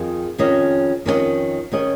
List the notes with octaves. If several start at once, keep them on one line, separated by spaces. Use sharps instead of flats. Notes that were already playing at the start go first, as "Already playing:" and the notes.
Already playing: F2 D#3 G#4 D#5
F2 D#3 C#4 G#4 D#5
F2 D#3 C#4 G#4 D#5
D#3 C#4 G#4 D#5